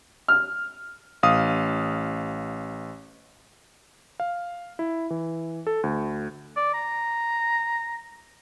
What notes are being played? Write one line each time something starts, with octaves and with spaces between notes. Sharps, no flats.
F6
A1 F5 D#6
F5
E4
E3
A4
D2
D5
A#5